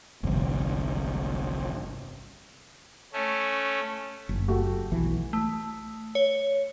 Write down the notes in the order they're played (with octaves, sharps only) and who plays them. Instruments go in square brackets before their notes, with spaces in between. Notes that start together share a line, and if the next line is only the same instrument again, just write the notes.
[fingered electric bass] G1 C2 F2
[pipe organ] A3 C#4
[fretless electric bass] F#1
[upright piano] A3 F#4 G4
[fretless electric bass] B1 E3
[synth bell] A3
C#5